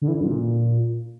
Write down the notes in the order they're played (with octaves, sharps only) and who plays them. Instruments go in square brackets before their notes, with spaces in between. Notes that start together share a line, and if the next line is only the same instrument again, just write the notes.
[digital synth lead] D3
E3
D3
F#2
A#2